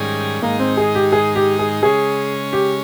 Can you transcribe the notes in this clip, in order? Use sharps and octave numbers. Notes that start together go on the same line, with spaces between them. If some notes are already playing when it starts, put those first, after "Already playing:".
Already playing: G#2 D#3 G3 C#4 G#4
G#2 D#3 G#3 A#3 D#4
C4
G#4
G4
G#4
G4
G#4
C#3 G#3 C#4 G#4
G4